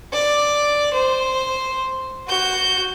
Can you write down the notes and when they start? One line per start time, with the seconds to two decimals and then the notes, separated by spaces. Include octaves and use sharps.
0.13 D5
0.94 C5
2.28 F#4 G6